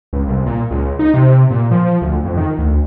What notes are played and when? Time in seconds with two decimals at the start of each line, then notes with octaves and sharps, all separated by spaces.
0.13 C#2
0.28 C2
0.46 A#2
0.71 C#2
0.99 D#4
1.14 C3
1.50 A#2
1.71 F3
2.02 D2
2.25 F2
2.37 D#3
2.59 D2